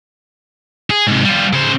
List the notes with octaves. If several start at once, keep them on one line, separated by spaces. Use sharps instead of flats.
G#4
G#2 C3
G3 F4
C#3 C5